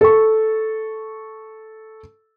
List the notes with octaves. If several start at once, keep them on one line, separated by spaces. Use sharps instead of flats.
A4 C#6